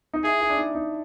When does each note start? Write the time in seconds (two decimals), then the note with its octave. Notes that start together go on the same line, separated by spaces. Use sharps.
0.14 D#4
0.24 E4 G#4
0.41 E4
0.49 D4
0.57 D#4
0.75 D#4